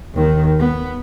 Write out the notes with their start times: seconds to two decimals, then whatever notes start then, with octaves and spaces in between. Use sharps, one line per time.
0.14 D#2 D#3
0.59 B3